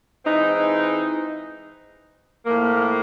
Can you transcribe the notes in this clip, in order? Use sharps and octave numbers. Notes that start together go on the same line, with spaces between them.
E3 G#3 C4 D#4
A2 F3 A#3